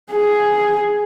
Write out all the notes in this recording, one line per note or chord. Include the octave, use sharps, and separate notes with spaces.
G#4